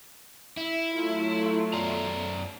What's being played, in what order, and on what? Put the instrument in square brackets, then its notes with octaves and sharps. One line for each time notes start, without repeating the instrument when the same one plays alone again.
[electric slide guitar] E4 [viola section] E5
[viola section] F#3 A3 F4
[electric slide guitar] F#2 D5 A#5